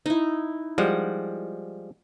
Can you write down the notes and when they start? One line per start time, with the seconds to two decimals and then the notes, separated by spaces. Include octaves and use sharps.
0.06 D#4 E4
0.78 F3 G3 G#3 F#5